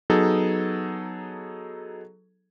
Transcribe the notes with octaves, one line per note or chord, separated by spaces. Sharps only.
F#3 B3 D#4 G#4 A4